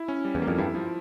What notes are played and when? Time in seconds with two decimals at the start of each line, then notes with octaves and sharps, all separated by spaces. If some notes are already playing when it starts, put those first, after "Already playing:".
Already playing: E4
0.08 C#4
0.25 G3
0.35 E2
0.42 A#3
0.47 F2
0.58 G2 E4
0.75 F3